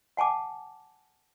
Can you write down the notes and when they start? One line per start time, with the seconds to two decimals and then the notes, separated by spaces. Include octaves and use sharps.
0.17 F#5 G#5 A5 D6